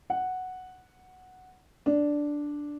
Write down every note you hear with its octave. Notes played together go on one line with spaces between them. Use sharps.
F#5
D4